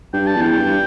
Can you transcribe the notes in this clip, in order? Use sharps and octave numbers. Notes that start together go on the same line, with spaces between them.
G2 G5
A5
E2
G5
G2